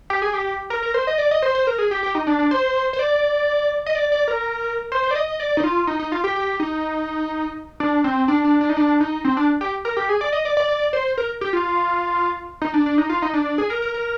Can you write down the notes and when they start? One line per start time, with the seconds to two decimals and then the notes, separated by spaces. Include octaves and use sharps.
0.10 G4
0.22 G#4
0.33 G4
0.70 A#4
0.82 A#4
0.94 C5
1.07 D#5
1.18 D5
1.31 D#5
1.42 C5
1.55 C5
1.67 A#4
1.78 G#4
1.91 G4
2.03 G4
2.15 D#4
2.27 D4
2.39 D4
2.51 C5
2.93 C5
2.99 D5
3.86 D#5
3.95 D5
4.12 D5
4.28 A#4
4.92 C5
5.03 C5
5.11 D5
5.15 D#5
5.28 D#5
5.40 D5
5.57 D#4
5.64 F4
5.87 D#4
5.99 D#4
6.12 F4
6.24 G4
6.36 G4
6.60 D#4
7.80 D4
8.04 C4
8.28 D4
8.44 D4
8.61 D4
8.69 D#4
8.77 D4
9.00 D#4
9.24 C4
9.37 D4
9.61 G4
9.85 A#4
9.97 G4
10.09 G#4
10.21 D5
10.33 D#5
10.45 D5
10.57 D5
10.69 D5
10.93 C5
11.17 A#4
11.41 G4
11.53 F4
12.62 D#4
12.74 D4
12.86 D4
12.98 D#4
13.09 F4
13.22 D#4
13.33 D4
13.45 D4
13.58 G#4
13.70 A#4
13.82 A#4
13.94 A#4